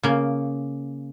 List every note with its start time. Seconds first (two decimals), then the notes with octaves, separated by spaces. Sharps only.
0.03 C#3 A#3